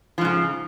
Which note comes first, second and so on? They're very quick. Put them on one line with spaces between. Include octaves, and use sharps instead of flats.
F3 G#2 C#3